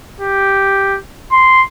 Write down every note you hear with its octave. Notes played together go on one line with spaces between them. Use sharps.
G4
C6